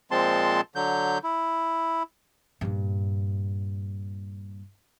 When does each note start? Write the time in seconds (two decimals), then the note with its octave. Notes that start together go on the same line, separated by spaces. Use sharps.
0.11 A#2 F3 G#3 C4 A5 C6
0.76 D3 F#3 G6
1.24 E4
2.61 G2 A#2